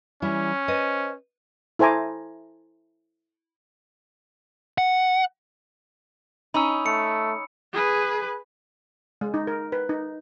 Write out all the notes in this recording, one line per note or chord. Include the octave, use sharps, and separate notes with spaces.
E3 G3 C#4 E4
B4 C5 D#5
E4 A4 C5 G#5 A#5 D6
F#5
C#4 D#4 B5 E6
A3 C#7
G#4 B4
G#3
D#4
A#4
B4
D#4